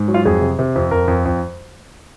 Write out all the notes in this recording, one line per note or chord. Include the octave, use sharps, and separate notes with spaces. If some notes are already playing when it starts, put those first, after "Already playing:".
Already playing: G#2
F#3
F4
F2 G#4
C3
C3
F2
F2 A#4
F2
F2